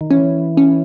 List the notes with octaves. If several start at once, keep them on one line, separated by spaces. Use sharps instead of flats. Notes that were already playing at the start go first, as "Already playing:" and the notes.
D#3
E3 C#4
C#4